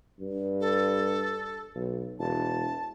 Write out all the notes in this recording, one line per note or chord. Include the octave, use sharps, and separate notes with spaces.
G2
A4
B1
E1 A5